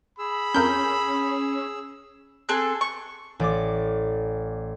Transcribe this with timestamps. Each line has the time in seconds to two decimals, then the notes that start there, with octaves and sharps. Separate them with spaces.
0.19 G#4 B5 E6
0.54 F2 C#4 A#4 G6
2.49 C4 G#4 A4 F#6
2.81 C#6
3.40 A1 D5 D6